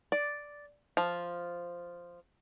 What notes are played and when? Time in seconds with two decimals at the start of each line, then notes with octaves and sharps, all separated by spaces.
0.12 D5
0.97 F3